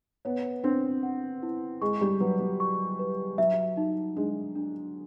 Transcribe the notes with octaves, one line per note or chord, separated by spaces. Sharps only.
B3 C#5
C4 D4
F#5
E4
G#3 C#6
G3
F#3 B4
F#3
C#6
B4
F#3 E5
D#4
G#3 D4
D4